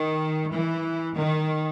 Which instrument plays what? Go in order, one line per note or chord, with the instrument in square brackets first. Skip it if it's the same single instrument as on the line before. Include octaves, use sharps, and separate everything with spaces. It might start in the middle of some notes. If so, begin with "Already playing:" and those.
Already playing: [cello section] D#3
E3
D#3